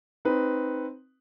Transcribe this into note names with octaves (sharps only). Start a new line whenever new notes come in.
C4 D#4 B4